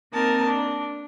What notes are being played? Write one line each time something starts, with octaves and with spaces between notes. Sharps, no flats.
A#3 C4 D#4 A#4 A5
D4